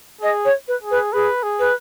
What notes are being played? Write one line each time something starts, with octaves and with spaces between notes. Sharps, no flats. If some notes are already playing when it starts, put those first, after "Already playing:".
G#4 D#5
C#5
B4
G#4
B4
G#4 B4
G#4
B4